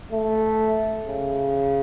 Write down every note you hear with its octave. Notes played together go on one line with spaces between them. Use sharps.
A3
C#3